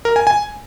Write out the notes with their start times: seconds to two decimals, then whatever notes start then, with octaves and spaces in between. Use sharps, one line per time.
0.05 A#4
0.16 G#5
0.27 G#5